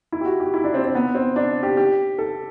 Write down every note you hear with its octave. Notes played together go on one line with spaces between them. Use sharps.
E4
G4
F#4
G4
E4
D4
C4
C4
B3
C4
D4
G4
G4
A4